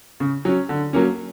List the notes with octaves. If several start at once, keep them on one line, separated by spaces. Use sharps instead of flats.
C#3
F#3 C#4
D3
F#3 A#3 C#4